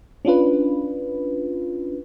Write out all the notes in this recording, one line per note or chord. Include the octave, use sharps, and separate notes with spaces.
C#4 D4 F4 B4